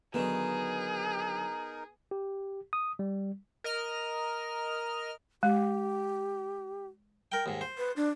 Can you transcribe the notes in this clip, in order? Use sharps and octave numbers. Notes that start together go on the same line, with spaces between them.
D3 D#3 F#3 B3 D#4 G#4 A#4
G4
D#6
G3
A#4 D#5 F6
G#3 G4
A#4 G5
D#2 G#2
C5
B4
D4